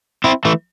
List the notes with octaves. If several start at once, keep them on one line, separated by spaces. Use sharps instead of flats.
C4 E4
E3 A3